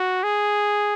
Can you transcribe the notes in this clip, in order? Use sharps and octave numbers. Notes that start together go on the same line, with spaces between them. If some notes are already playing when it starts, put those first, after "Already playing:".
Already playing: F#4
G#4